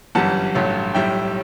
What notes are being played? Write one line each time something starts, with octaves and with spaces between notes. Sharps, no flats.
G1 F#2 E3 G3 F#5 A5
A1 G2 F#3 A3
B1 A2 G3 E5 G5